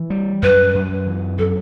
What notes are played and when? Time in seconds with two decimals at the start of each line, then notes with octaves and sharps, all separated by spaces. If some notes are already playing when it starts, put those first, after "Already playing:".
Already playing: E3
0.10 G3
0.42 F#2 B4
0.75 F#2
1.07 E3
1.39 F#3 A4